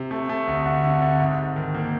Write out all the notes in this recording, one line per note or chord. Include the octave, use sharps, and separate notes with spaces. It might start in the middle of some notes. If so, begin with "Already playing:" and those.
Already playing: C3
A3
A3
D2
D3
D3
D3
G#2
G#2
D#3
A#3